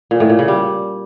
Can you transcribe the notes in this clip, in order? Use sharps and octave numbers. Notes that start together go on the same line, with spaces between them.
A#2
A2
A#2
C#3
G3